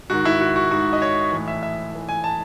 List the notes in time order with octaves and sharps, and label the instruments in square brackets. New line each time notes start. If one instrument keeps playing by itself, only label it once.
[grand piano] G#2 D#3 F#4
E4
F#4
F#4
G#2 D#3 F#4
D#5
C#5
A2 E3
E5
E5
A2 E3
G#5
A5